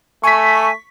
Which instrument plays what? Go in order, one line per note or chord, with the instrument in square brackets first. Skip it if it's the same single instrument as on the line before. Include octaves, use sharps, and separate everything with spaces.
[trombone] A3 [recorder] G#5 [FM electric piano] C#6 B6